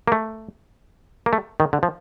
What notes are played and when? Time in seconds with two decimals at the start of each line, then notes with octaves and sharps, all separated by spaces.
0.08 A#3
0.12 A3
1.26 A#3
1.33 A3
1.60 D#3
1.73 D3
1.83 F3